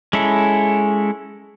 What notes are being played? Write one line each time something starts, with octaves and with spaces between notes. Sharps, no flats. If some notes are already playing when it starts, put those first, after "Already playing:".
G#3 C#4 E4 A4